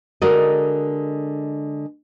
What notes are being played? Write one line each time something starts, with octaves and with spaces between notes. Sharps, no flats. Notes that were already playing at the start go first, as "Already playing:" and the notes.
D3 G#3 F#4 A#4 D5 D#5